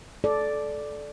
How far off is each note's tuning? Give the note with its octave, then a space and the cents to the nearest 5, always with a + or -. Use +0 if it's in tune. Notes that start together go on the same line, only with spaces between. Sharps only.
A4 -20 D5 +0